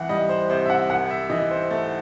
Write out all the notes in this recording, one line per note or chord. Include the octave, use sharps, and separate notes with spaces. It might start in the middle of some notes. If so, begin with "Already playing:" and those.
Already playing: C2 E3 F#5
G3 D#5
C5
C3 C5
E5
F#5
C2 F#5
E5
E3 D#5
C5
A3